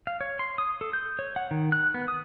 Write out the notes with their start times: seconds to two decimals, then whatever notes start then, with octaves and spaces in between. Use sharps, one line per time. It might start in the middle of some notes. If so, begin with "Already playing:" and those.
0.07 F5
0.21 C#5
0.39 C6
0.58 D#6
0.81 A4
0.93 G6
1.19 C#5
1.36 F#5
1.51 D#3
1.72 F#6
1.94 B3
2.08 D#6